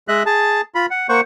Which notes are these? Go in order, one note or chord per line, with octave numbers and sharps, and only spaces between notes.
G#3 D#5 E5 F#6
G#4 A5
F4 B5
F#5
A#3 C5 F#5 C#6